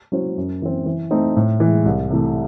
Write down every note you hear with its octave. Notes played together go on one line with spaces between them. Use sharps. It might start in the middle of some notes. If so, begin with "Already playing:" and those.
F#3 C#4 E4 C5
F#2
E3 C4
E3
A3 C4 D#4
A2
E3 G#3
C2
C3 E3 A3